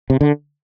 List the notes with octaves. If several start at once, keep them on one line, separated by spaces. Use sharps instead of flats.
C3
D3